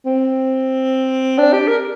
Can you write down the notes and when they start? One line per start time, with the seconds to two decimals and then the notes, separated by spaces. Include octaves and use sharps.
0.05 C4
1.38 D4
1.53 G4
1.68 A#4